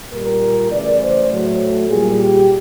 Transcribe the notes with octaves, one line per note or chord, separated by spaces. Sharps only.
A#2 G3 A#4
C#3 E3 A3 D5
C5
A2 F#3 A3
A#2 G3 G#4
G4